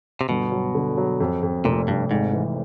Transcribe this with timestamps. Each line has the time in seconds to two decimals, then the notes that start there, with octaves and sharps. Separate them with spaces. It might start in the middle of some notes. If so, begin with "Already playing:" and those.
0.21 C3
0.29 G1 B2
0.52 F#3
0.75 D3
0.97 F#3
1.20 F2
1.43 F2
1.65 F1 A#2
1.88 F1 G2
2.11 G#1 G#2
2.33 E3